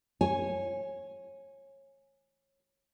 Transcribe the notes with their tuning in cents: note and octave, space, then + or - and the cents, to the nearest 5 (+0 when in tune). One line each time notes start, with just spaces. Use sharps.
C#5 -25 G#5 +0